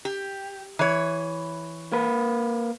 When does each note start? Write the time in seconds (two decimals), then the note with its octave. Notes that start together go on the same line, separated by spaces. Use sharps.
0.05 G4
0.79 E3 C#5
1.92 A#3 B4